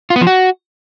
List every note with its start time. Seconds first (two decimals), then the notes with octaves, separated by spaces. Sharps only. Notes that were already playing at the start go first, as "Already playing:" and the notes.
0.10 F4
0.16 B3
0.21 F3
0.27 F#4